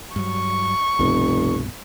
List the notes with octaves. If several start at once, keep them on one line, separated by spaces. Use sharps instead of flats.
G2 F#3 C#6
F1 C2 G2 B2